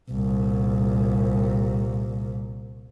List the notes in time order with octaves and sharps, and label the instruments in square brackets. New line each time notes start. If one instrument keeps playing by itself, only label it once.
[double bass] C2 A#2